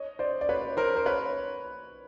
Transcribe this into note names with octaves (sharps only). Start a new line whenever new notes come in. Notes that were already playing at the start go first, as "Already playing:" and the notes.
Already playing: C#5 D#5
C5 D5
D5
B4 C#5
A#4 C5
C5
B4 C#5